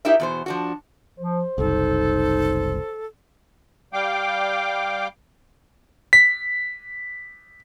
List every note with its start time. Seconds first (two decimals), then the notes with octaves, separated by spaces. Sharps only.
0.05 D#4 E4 G4 A#4 D5 E5
0.20 E2 B2 C5
0.46 F3 D4 F#4
1.19 F3 C5
1.58 F#1 C2 D#4 A4
3.93 G3 F5 G5 D6
6.13 B6